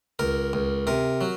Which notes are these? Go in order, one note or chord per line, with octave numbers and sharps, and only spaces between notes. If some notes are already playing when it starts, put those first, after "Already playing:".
C#2 A#4
C#2
C3 A#4
F#3